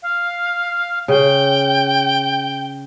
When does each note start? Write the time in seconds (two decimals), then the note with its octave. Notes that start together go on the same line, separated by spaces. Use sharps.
0.02 F5
1.08 C#3 G5